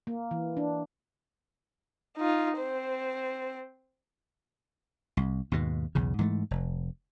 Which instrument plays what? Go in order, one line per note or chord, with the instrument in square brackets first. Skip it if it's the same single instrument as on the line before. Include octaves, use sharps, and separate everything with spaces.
[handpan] A#3
E3
D4
[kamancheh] D#4 F4
C4 C5
[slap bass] C2
D#2 G#2 B2
B1 E2 C#3
G#2 E3 F#3 A3
F1